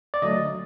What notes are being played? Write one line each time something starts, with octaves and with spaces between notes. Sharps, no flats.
D5
D3 F#3 A3 D#5